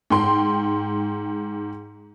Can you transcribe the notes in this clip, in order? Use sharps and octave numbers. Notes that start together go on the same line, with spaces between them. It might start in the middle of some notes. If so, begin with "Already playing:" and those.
G#2 G5 C6